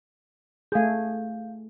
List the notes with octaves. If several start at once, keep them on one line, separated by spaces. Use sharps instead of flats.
A3 G#4 F5 G6